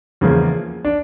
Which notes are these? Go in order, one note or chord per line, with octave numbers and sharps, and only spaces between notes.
E2 C#3 F3 A#3
D4